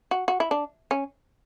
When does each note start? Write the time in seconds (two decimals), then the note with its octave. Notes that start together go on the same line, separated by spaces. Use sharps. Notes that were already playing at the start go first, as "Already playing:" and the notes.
0.11 F#4
0.28 F#4
0.40 E4
0.51 D4
0.91 C#4